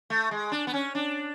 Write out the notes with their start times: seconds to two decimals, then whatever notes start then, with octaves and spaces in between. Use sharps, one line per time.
0.10 A3
0.31 G#3
0.52 D4
0.67 B3
0.74 C#4
0.95 D4